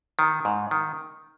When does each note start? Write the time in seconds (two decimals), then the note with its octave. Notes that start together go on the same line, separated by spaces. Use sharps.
0.19 D#3
0.45 G#2
0.71 D#3